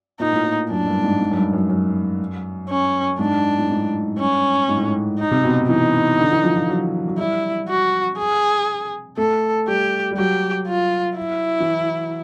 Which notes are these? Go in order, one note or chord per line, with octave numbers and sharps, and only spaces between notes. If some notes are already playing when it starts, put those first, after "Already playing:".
A#2 D#4
A2
A#2
F#2 D4
G2
G#2
G#2
F#2
G2
F#2
F#2
C#4
G#2 D4
A2
G#2
G2 C#4
G#2
A2
G#2
D#4
C3
B2
E3 D#4
D3
E3
F3
F3
F#3
F#3
G3 E4
F#4
G#4
A3 A4
G3 G4
G3
F#3 G4
F4
E4
E3